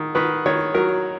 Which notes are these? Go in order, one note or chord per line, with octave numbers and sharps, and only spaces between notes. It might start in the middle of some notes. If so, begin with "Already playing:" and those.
Already playing: D#3
D#3 B4
D#3 C#5
F#3 A#4